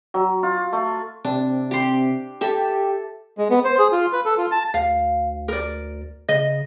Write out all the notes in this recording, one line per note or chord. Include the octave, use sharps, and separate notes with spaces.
F#3
F4
A3
C3 D4
G4 C6
G4 A4 E5
G#3
B3
C5
G#4
F4
B4
A4
F4
A5
D2 F5
A#4 D5
C#3 D#5